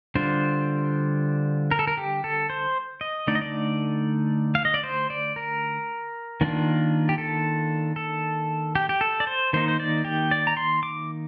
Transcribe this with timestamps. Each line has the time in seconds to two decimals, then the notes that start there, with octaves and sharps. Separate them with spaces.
0.15 D3 G3 D4 F4 C5
1.71 A#4
1.79 A4
1.87 A#4
1.97 G4
2.24 A4
2.50 C5
3.01 D#5
3.27 D3 A3 D#4 D5
3.35 D#5
3.42 D5
4.55 F5
4.65 D#5
4.74 D5
4.84 C5
5.10 D5
5.36 A#4
6.41 D#3 A#3 D4 F4
7.09 G4
7.18 A4
7.96 A4
8.75 G4
8.89 G4
9.01 A4
9.20 D5
9.27 C5
9.53 D#3 A#3 D#4 C5
9.68 C5
9.80 D5
10.05 G4
10.31 D5
10.47 A#5
10.57 C6
10.83 D6